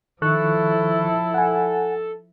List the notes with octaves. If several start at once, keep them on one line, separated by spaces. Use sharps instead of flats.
D#3 F3 E4 A4 C#6 F#6
F#5 G#5